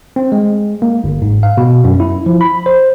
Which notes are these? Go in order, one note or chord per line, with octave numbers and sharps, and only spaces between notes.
C4
G#3
A#3
G1
G#2
F5
B2
F#2
E4
F3
B5
C5